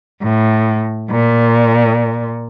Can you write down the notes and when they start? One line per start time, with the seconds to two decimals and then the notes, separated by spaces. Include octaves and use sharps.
0.23 A2
1.10 A#2